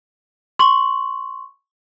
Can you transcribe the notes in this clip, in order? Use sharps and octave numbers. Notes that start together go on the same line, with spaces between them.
C6 C#6 F#7